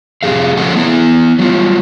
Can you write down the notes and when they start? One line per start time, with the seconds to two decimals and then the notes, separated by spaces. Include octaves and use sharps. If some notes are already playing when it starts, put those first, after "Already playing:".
0.23 F2 C3 C4 G4 G#4 F5
0.57 A2 F3 C#4 A4 F#5
0.76 B3 E4
1.39 F#3 G3 F4